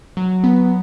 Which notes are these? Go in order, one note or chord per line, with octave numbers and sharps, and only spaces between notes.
F#3
B3